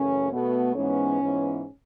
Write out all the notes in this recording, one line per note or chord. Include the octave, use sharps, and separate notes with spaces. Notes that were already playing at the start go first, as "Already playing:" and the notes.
Already playing: F#2 C#3 E3 A3 C#4
B2 A3 B3
G#2 E3 G#3 B3 C#4
G#2 E3 G#3 B3